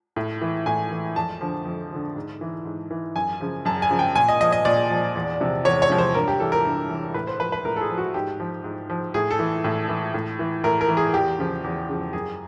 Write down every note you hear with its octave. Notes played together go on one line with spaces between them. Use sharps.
A2
E3
A2 G#5
E3
F2 A5
D3 F3
F2
D3 F3
G#2
E3
G#2
E3
F#2 G#5
C#3 F3
F#2 A5
G#5
C#3 F3
G5
A#2 G#5
D#5
F3 D#5
D#5
A#2 D5
F3
E2
C3 F3
E2 C#5
C#5
C3 F3
C5
G2 A#4
G4
E3 A4
A#4
G2
E3
A2 B4
C5
F3 B4
B4
A2 A#4
A4
G#4
F3
F#4
G#2 G4
F3
G#2
F3
A2 G#4
A4
E3
A2
E3
A2
E3
A2 A#4
A#4
E3
G#4
E2 G4
C#3 F3
E2
C#3 F3
F#2 G#4